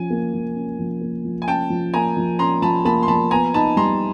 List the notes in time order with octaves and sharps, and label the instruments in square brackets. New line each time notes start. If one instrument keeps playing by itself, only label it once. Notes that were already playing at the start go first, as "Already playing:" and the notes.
Already playing: [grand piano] F3 C#4 [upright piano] G#5
[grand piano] A#3
F3
C#4
F3
A#3
F3
[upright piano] G#5
[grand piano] C#4 [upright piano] G5 A5
[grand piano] F3
[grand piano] A#3 [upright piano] G#5 A#5
[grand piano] F3
[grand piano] C#4 [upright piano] A#5 C6
[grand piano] F3 [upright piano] A5 B5
[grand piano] A#3 [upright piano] A5 B5
[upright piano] C6
[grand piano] F3 [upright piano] A5 B5
[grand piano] B3 [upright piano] G#5 A#5
[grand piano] D#4 [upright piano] A5 B5
[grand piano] G3 [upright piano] A#5 C6